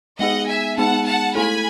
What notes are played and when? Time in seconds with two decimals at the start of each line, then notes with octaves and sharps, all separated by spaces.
0.19 G#3 B3 D#4 G#4 D#5 F#5
0.48 E5 G#5
0.77 G#3 B3 D#4 G#4 F#5 A5
1.06 F#5 A5
1.35 A3 E4 A4 G#5 B5